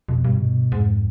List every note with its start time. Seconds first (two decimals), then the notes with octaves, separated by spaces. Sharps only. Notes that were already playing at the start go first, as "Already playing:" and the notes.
0.08 F2 B2
0.24 G2
0.40 B2
0.72 F2 G#2